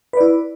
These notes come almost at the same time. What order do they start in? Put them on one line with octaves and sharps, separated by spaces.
B4 D5 E4